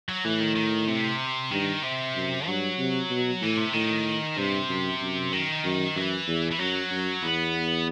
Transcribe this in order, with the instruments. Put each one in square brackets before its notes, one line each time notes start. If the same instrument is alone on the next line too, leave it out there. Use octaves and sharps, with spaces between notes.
[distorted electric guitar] F#3
[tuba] A2 [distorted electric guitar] E3
[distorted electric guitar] D#3
D#3
C3
[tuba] G2 [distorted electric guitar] D#3
[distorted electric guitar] C3
[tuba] F#2
[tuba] G2 [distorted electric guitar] F#3
[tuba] C3
B2
[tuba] A2 [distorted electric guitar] E3
[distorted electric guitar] C3
[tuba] A2 [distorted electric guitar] D#3
[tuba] G2 [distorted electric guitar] C3
[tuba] F#2
F#2
[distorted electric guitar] D#3
[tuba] F#2
[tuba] F#2 [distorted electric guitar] E3
[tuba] E2
[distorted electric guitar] E3
[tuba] F#2 [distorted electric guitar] F#3
[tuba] F#2
[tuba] E2 [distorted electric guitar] B3